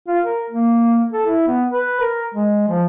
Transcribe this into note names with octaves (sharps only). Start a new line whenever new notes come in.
F4
A#4
A#3
A4
E4
B3
B4
A#4
G#3
F3